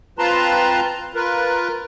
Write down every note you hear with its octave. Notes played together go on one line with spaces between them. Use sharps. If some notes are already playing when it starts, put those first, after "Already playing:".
C4 F4 B4 A5 A#5 C6
F4 A#4 B4